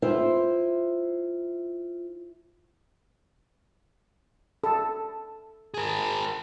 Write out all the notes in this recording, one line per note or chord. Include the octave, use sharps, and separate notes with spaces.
E4 F4 C5 E5
A4
G#4 A#4